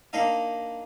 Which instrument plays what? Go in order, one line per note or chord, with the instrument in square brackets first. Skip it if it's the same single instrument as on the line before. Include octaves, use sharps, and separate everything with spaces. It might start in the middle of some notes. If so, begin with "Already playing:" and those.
[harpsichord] A#3 D4 D#4 F5